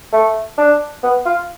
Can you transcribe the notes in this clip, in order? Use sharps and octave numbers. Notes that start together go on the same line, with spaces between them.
A3
D4
B3
F4